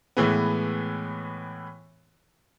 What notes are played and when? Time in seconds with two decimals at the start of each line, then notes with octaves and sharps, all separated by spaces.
0.17 A2 E3 G#3 B3